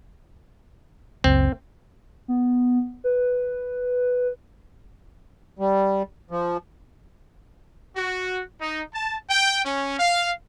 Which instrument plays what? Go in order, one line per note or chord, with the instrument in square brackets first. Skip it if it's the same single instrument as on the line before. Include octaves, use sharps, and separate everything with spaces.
[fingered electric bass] F#1 C#2 [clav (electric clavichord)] C4
[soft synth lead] B3
B4
[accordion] G3
F3
[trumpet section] F#4
D#4
A5
G5
C#4
F5